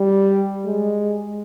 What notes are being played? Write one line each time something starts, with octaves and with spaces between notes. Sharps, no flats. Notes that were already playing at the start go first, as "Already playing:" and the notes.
Already playing: G3
G#3